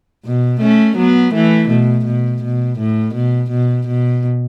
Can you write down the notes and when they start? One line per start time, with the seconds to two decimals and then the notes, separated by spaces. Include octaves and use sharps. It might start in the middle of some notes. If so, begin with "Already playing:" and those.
0.25 B2
0.61 A3 C#4
0.97 F#3 B3
1.34 E3 A3
1.69 B2
2.06 B2
2.43 B2
2.79 A2
3.15 B2
3.51 B2
3.88 B2